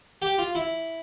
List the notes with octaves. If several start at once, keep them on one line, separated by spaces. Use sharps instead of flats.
G4
F4
E4